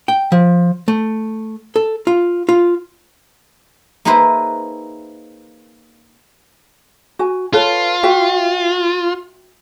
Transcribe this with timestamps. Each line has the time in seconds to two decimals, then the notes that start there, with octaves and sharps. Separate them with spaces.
0.08 G5
0.32 F3
0.88 A3
1.76 A4
2.07 F4
2.49 F4
4.05 A#3 D#4 G#4 B4 C5 E5
7.19 F#4 G#5
7.53 F4 A4 B4 C#5
8.03 F#4 E5 G5